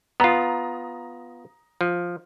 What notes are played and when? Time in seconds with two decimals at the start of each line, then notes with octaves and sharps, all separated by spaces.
0.20 B3 F4 A#5 D#6
1.81 F3